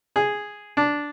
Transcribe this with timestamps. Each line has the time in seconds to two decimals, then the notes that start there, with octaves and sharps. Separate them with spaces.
0.16 G#4
0.77 D4